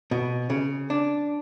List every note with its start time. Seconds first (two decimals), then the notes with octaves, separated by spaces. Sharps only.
0.11 B2
0.50 C#3
0.90 D4